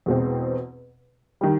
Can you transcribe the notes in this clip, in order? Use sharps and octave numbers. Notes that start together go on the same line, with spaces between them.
E2 B2 G#3 C4
D#3 G3